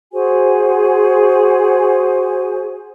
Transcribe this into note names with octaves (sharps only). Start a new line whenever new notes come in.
F#4 G#4 C5 G#5